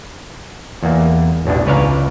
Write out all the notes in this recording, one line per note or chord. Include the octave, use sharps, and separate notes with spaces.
E2 A#3
A1 E2 B2 D4
C#2 B4 C#5 D5 F5 A#5